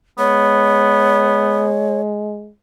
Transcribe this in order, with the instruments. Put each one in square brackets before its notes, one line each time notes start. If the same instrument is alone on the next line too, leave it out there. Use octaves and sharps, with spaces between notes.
[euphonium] G#3 [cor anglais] B3 [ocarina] C#5